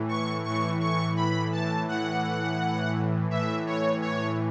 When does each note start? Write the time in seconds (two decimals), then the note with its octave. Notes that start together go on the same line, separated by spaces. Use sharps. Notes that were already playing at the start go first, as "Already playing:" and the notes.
Already playing: A2 E3
0.09 C#6
0.44 A2 E3 C#6
0.81 C#6
1.16 B5
1.52 A5
1.88 A2 E3 F#5
3.31 A2 E3 E5
3.67 C#5
4.02 C#5